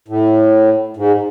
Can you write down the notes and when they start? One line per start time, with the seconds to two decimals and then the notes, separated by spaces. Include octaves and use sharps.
0.08 A2
0.97 G#2